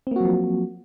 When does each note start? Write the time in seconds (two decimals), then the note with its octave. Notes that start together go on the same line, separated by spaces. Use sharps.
0.07 C4
0.11 A#3
0.16 F#4
0.20 F#3
0.25 F3